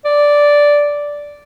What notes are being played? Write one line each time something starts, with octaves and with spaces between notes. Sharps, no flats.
D5